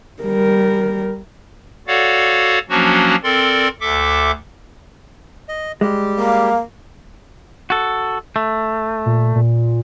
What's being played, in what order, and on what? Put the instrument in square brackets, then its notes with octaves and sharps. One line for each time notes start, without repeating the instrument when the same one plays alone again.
[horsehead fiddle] G3 A#4
[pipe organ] F#4 A4 C#5 D5 F5 F#5
F3 F#3 A#3 C#4 D4 F#4
C4 A4 A#4 D5 C6
D2 A4 E5 D6
[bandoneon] D#5
[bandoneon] G3 G4 [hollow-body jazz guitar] G#3
[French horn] A#3 [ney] F5
[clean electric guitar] F#4 A4
A3
[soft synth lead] A#2
A#2